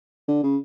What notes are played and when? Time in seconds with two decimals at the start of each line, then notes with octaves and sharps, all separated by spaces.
0.28 D3
0.44 C#3